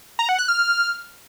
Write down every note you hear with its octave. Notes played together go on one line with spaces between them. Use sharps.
A#5
F#5
F#6
F6